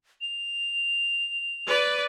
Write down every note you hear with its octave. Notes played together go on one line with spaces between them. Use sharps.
F7
B4 D5